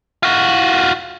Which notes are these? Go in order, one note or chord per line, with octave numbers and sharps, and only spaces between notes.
F4 F#4